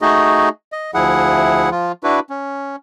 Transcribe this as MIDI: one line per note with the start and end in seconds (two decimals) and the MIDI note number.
0.02 0.49 57
0.02 0.49 63
0.02 0.49 66
0.02 0.49 68
0.02 0.49 75
0.72 0.91 75
0.94 1.70 38
0.94 1.70 53
0.94 1.70 64
0.94 1.70 68
0.94 1.70 78
1.71 1.92 53
1.71 1.92 65
2.03 2.20 62
2.03 2.20 64
2.03 2.20 66
2.03 2.20 71
2.30 2.76 61